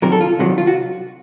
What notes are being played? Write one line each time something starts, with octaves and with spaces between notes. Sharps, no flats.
C2 C3 D#3 F#3 A#4
A4
F4
C2 C3 D#3 F#3 F#4
F4
F#4